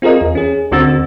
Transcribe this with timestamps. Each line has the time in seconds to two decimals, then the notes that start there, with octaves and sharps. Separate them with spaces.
0.02 C4 F4 G#4 A#4 D#5
0.21 E2
0.35 C#4 G#4
0.71 D2 D3 C4 F#4 E6 A6